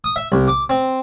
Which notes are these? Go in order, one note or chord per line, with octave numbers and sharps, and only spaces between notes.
D#6
E5
C2
D6
C4